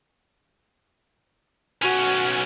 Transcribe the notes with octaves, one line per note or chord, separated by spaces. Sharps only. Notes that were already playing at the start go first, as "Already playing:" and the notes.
B1 C#4 F#4